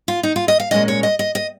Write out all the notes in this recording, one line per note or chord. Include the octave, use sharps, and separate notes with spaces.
F4
D#4
F4
D#5
F5
A#2 G#3 C#4 D#5
C#5
D#5
D#5
D#5